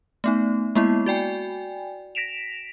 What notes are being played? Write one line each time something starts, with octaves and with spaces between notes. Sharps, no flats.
A3 B3 D#4
G#3 A#3 B3 E4
F#4 D5 G5 G#5
A#6 B6 D7 E7 F7